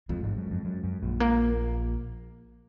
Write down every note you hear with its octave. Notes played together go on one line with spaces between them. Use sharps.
F2 F3 G#3
G#1 G#2
F#2
F2
F#2
F#2
A#1 A#2
A#3